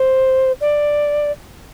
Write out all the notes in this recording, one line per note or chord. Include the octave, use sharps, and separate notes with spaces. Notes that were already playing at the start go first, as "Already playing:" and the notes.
Already playing: C5
D5